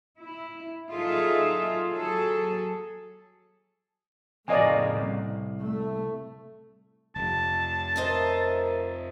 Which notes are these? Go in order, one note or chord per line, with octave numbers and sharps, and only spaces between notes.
E4
F#3 D#4 F4 G#4 A4 E5
F#3 G#4 A4
F2 A2 C#3 A#3 D5 D#5 G#5
C2
A3
F1 A5
A#4 C5 D#5 E5